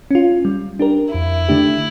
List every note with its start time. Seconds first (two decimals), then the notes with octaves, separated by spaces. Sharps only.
0.11 C#4 F4
0.45 G3
0.79 D4 G4 A#4
1.14 F2 E4
1.49 D3 A3 D4 G4